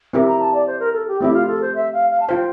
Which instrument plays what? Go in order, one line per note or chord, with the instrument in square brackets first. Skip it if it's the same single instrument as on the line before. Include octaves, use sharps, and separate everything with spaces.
[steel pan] C4 E4 G4 A#4
[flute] A#5
A5
D5
C5
A#4
A4
G4
[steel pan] A3 C4 G4 [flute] E4
[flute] F4
A4
C5
E5
F5
F5
A5
[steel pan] F4 C5 F5 [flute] G5